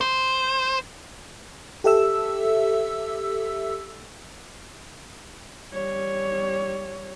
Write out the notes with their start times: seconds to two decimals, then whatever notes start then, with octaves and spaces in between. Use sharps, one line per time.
0.01 C5
1.84 G4 A4 E5 E6
5.73 G3 C#5